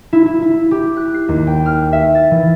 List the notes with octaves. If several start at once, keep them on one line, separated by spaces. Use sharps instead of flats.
E4
E4
E4
G4
F#6
C7
D#2
G5
F6
E5
A6
E3